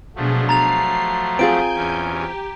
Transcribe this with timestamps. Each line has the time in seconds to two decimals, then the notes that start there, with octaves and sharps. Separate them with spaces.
0.16 B2 F3 F#3 A3 D4 G#4
0.49 A#5 A6 C7 F7
1.39 C4 F4 G#4 G#5 G6 D7
1.75 E2 C#4
2.11 G4